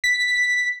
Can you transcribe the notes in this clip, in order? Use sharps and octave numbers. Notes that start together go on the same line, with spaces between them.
B6